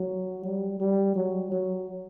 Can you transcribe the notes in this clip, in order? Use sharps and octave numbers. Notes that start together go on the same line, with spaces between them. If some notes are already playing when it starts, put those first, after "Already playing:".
Already playing: F#3
G3
G3
F#3
F#3